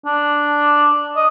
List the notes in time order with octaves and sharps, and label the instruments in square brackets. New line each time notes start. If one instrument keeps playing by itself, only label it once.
[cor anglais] D4
D#5